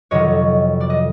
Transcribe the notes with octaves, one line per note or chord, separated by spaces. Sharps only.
F2 C3 D#3 F#3 C#5 D#5
D5
D#5